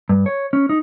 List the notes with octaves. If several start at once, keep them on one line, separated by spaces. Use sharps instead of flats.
G2
C#5
C#4
D#4